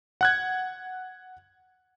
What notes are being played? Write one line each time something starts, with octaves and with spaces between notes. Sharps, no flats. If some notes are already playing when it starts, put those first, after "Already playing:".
F#5 F#6 G#6